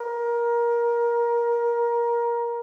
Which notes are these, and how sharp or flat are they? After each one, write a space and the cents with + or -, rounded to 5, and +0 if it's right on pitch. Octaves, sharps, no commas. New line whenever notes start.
A#4 +20